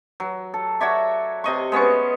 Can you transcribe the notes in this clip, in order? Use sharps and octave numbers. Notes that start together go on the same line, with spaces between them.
F#3
A4
F#4 C#5 D5 E5
C3 D#5 C#6
G#3 B3 C#4 C#6